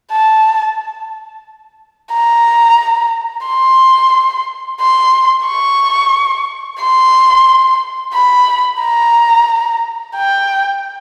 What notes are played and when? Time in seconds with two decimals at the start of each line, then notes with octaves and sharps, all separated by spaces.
0.12 A5
2.13 A#5
3.47 C6
4.81 C6
5.47 C#6
6.81 C6
8.15 B5
8.82 A#5
10.16 G5